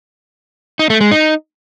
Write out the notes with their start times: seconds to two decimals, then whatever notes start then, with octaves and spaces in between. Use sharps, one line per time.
0.79 D#4
0.90 A3
1.01 G#3
1.11 D#4